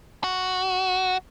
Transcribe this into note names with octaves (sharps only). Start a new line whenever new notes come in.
F#4